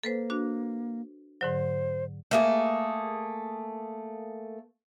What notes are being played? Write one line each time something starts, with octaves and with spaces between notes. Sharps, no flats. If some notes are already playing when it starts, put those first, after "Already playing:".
A#3 A4 B4 C5
D4 F#4
G#2 D3 F#3 C5
A3 A#3 G#4